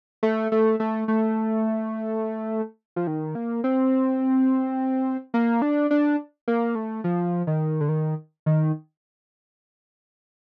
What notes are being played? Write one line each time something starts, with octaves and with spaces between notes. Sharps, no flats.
A3
A3
A3
A3
F3
D#3
A#3
C4
A#3
D4
D4
A#3
A3
F3
D#3
D3
D#3
D#3